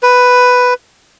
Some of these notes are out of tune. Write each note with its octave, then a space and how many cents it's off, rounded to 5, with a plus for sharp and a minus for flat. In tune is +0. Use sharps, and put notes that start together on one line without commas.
B4 +5